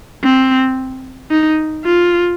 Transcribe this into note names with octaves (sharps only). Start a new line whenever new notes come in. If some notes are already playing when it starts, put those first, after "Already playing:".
C4
D#4
F4